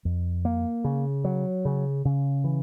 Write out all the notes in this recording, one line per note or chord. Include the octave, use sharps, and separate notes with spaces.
F2
A#3
C#3
F#3
C#3
C#3
E3